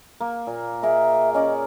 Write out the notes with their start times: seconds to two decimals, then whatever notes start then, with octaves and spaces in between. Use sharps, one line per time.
0.21 A#3
0.47 A#2
0.83 G#4 A#4 D#5 E5
1.34 C#4 D5 D#5